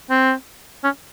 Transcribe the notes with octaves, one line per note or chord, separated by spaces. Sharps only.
C4
C#4